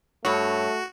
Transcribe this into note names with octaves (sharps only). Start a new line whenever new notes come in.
G2 A3 F#4 C#5